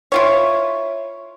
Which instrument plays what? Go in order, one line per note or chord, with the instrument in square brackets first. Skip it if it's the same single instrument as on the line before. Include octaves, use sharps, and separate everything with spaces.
[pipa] E4 F4 C#5